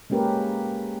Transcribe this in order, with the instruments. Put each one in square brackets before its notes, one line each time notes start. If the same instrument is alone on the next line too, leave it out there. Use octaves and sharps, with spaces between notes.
[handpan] G#3 A#3 C#4 G4 A#4 B4